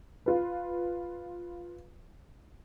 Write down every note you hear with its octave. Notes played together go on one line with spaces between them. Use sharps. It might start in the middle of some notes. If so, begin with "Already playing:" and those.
F4 B4